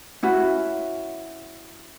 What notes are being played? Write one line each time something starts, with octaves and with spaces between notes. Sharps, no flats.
C#4 E4 F#4